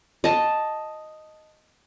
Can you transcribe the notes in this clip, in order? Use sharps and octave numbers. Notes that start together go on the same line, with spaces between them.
D#5 A5